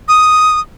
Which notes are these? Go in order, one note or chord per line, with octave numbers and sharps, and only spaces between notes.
D#6